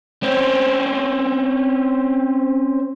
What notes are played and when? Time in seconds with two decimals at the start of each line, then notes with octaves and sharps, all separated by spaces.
0.23 C4 C#4